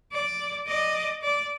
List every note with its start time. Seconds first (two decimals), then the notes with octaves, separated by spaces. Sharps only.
0.12 D5
0.67 D5 D#5
1.22 D5